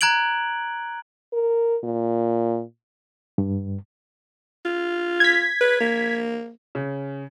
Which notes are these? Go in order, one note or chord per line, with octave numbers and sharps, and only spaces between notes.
A#5 F#6 G#6 D7 F#7
A#4
A#2
G2
F4
G#6 B6
B4
A#3
C#3